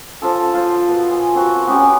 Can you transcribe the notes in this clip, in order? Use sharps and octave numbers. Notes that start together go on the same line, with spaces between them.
F3 F4 A4
F4 C5
B2
G#5 C6
C4 F#4 A#4
B3 C#4 G4